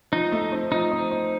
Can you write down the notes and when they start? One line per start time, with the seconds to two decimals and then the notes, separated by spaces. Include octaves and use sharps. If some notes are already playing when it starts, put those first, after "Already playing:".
0.12 F3 D#4
0.32 A3
0.52 C4
0.71 F3 D#4
0.91 C4
1.11 C4